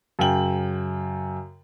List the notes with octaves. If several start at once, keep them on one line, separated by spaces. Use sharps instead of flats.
F#2 C#3 G5 F#7